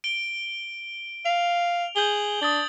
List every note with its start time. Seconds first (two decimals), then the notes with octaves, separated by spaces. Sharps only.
0.04 D7 G7
1.25 F5 F7
1.96 G#4 G6 F#7 G7
2.41 D4 D#6 A6 F#7